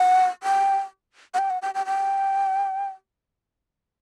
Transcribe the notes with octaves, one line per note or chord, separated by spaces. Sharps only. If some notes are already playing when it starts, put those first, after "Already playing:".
Already playing: F#5
G5
F#5
G5
F#5
G5
G5
G5